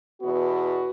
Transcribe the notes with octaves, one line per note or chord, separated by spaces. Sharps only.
E2 B2 B3 F#4